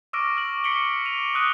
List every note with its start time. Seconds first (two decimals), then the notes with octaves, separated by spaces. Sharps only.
0.13 C#6 D6 E6 F6 A#6 D7
0.37 F6 F#7
0.64 B6 C#7 D7 F#7 G7
1.05 D#7 F7
1.34 D#6 E6 F#6 D#7 G7